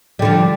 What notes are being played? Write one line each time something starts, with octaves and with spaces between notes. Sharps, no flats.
D3 F3 G3